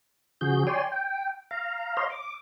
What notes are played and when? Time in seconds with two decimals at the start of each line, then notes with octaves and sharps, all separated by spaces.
0.41 C#3 F3 F#4 G#4 G6
0.67 C#5 D5 G5 G#5 C6
0.92 G5
1.51 F5 A#5
1.97 C5 C#5 D#5 F5 A#5 C6
2.10 D6